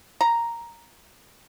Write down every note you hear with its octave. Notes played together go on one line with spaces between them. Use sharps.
A#5